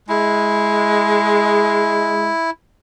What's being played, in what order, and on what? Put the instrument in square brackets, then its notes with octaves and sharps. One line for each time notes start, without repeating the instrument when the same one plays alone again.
[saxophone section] G#3 [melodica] E4